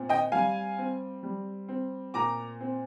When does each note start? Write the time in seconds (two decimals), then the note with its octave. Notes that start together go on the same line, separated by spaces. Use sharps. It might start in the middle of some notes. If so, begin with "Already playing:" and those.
Already playing: A#2 C4
0.09 D#5 G5
0.32 G3 F5 G#5
0.78 C4
1.23 G3
1.68 C4
2.14 A#2 A#5 D6
2.61 C4